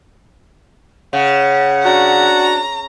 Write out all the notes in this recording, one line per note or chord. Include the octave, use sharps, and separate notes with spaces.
C#3 F#5
D4 F#4 A#5